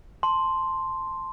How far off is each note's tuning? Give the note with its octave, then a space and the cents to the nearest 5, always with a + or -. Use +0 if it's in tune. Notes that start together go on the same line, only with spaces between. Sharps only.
A5 +0 C6 +0